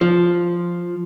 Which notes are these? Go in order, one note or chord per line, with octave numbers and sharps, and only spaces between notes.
F3